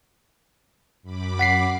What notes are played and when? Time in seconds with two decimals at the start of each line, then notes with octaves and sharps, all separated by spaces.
1.03 F#2 B5 D6
1.39 F#5 B6 C7